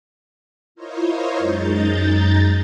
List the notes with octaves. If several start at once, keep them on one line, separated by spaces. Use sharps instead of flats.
E4 F4 A#4 C5 C#5 D#5
F#2 G#3 D#4 A#5 G6 A6